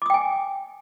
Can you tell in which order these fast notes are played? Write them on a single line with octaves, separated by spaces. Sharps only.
D6 D#6 G5 G#5